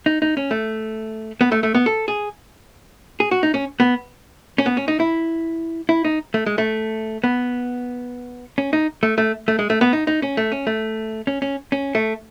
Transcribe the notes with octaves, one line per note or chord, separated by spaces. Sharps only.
D#4
D#4
C#4
A3
B3
A3
A3
B3
A4
G#4
G#4
F#4
D#4
C#4
B3
C#4
B3
C#4
D#4
E4
E4
D#4
A3
G#3
A3
B3
C#4
D#4
A3
A3
A3
G#3
A3
B3
D#4
D#4
C#4
A3
C#4
A3
C#4
C#4
C#4
A3